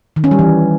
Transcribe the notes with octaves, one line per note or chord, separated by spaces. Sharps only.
D#3
C#4
G3
E3